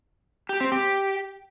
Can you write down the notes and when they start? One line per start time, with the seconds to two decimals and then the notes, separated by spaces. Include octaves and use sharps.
0.49 G4
0.61 C4
0.72 G4